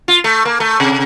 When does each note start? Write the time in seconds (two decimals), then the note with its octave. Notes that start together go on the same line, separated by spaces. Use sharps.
0.08 F4
0.24 A3
0.45 A#3
0.60 A3
0.80 C3